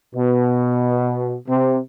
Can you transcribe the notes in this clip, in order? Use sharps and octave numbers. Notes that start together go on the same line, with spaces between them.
B2
C3